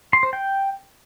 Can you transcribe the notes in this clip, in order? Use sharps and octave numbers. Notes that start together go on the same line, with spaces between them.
C6
C5
G5